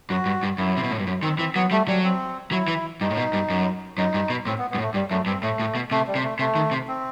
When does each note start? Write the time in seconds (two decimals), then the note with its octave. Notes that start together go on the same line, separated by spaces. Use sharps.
0.10 F#2 F#4
0.26 G2
0.43 G2
0.58 F#2 E4
0.77 C3
0.83 B2
0.91 A2
0.99 G2
1.07 F#2
1.23 D#3 C4
1.39 E3 C4
1.55 F#3 B3
1.71 G3 A3
1.88 F#3 G3
2.04 C4
2.52 F#3 E4
2.68 E3
3.01 G2 D#4
3.10 A2
3.17 B2
3.33 G2
3.50 F#2
3.97 F#2 D#4
4.14 G2
4.30 B2
4.46 A2 C4
4.58 B3
4.70 B3
4.75 G2
4.78 A2
4.82 A3
4.94 G2 G3
5.10 F#2 A3
5.26 G2 C4
5.43 A2 A3
5.60 A2
5.75 B2
5.91 C3 A3
6.07 G3
6.15 C3
6.23 A3
6.39 C3 A3
6.55 D#3
6.71 C3
6.88 C4